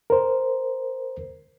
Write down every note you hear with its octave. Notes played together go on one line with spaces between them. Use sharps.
A#4 C5